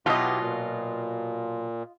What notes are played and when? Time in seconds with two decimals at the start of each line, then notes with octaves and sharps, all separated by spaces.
0.06 B2 F#3 B3 E4 F4 G4 D#5
0.41 A#2